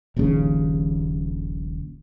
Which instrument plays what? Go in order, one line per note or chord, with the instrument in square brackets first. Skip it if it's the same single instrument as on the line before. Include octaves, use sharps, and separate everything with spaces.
[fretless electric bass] D#1 A#1 D#2 C#3